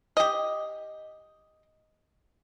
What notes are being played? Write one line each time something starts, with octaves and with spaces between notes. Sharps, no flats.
G4 D#5